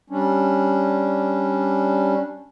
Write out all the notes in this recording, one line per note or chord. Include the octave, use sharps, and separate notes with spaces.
G3 C#4 D4